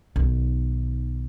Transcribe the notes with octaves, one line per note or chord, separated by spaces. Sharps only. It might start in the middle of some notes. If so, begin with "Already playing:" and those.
B1 D#3